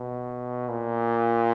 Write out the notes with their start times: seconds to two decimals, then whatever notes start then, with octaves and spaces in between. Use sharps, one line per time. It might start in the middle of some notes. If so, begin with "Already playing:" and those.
Already playing: B2
0.69 A#2